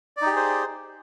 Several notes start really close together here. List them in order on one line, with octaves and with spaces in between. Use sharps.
D5 D#4 G4 G#4 C5